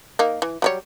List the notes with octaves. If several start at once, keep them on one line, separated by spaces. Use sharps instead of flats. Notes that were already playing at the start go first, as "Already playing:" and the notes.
A#3 D#4
E3
F#3 G3 C#5